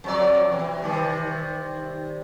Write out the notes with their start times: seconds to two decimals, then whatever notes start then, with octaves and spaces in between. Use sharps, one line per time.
0.04 F2 F#3 D5
0.49 B2 E3
0.82 C3 D#3 G3